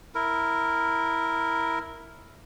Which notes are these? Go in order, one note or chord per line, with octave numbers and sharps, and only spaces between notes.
E4 A#4